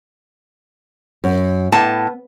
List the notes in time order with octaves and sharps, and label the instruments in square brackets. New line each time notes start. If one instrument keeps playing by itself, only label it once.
[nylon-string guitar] F#2
[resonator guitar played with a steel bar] A2 A5 [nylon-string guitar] B3